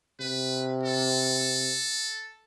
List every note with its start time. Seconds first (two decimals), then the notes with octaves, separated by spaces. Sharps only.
0.20 C3 B4
0.83 A4